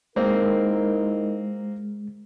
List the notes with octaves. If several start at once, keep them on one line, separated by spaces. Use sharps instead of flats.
G#3 A#3 C4 D#4 E4 A#4